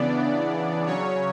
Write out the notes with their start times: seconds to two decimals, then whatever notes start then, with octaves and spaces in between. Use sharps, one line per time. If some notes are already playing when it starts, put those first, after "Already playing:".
Already playing: C#3 E3 B3 D4 D5
0.86 C#3 F#3 C#4 C#5